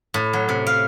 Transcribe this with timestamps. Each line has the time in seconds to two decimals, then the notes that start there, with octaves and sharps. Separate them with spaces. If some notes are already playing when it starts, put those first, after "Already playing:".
0.14 A2
0.33 F#3
0.49 C3
0.67 F5